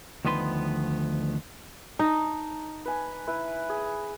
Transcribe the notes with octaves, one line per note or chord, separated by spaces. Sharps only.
D2 D#3 F3 B3 B4 C6
D#4 A5 A#5
B4 G#5
E4 B4
G#4